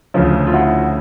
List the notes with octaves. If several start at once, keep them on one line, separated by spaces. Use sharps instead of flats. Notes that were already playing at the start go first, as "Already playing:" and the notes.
D2 C#3 F3
F4
E4 F#4